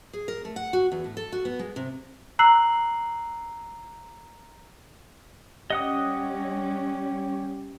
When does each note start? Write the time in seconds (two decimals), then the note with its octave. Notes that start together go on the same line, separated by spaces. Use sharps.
0.13 G#4
0.28 A#4
0.45 A3
0.56 F#5
0.73 F#4
0.92 E2
1.04 A2
1.17 A4
1.32 F#4
1.45 B3
1.59 G#3
1.76 C3
2.39 A#5 E6 F#6 C7 F#7
5.70 G3 C#4 G4 D#5 F#5 D#6